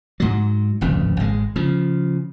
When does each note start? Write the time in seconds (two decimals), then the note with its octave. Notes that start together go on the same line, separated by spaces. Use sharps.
0.20 G#2 F#3
0.81 D1 G#1 F2 C#3
1.20 G#1 G#3
1.56 C#3 F3